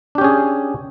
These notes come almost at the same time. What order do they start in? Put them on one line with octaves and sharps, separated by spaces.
D4 G4 C#4 G#4